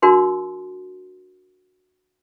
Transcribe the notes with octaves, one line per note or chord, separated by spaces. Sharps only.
D4 F#4 A#4 C6